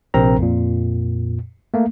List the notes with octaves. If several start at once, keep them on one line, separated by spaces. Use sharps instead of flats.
A#1 C3 C4 A#4 A#5
F2 A#2
A3 A#3